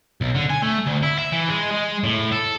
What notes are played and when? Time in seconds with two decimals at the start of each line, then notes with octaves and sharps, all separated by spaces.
0.21 B1
0.35 D3
0.50 G#5
0.62 A3
0.87 D2
1.03 E4
1.19 E5
1.32 E3
1.49 G#3
1.71 G#3
2.04 A2
2.32 A4